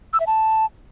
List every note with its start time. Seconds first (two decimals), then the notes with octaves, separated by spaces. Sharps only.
0.13 E6
0.20 E5
0.27 A5